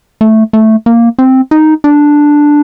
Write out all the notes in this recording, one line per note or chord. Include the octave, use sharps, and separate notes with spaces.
A3
A3
A#3
C4
D#4
D4